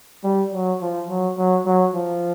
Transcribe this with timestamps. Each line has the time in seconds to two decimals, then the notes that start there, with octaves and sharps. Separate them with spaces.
0.24 G3
0.53 F#3
0.81 F3
1.08 F#3
1.37 F#3
1.65 F#3
1.94 F3